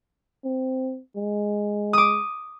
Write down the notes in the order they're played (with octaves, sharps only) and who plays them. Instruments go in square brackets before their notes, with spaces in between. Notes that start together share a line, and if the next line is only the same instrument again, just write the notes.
[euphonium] C4
G#3
[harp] D6 D#6